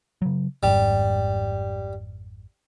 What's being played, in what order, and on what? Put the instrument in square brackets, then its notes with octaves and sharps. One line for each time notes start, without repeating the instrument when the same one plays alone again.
[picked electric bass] C#3 F#3
[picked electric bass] G#1 F2 G#2 [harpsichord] G3